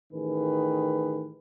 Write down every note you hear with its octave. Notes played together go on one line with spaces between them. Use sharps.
A1 D#3 G#4 B4